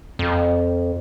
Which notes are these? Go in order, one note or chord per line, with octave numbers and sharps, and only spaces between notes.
F2